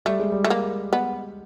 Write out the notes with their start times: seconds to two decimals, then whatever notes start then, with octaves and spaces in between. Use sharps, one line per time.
0.06 G3 A3
0.19 G#3
0.32 G3
0.45 A3
0.50 A#3
0.93 B3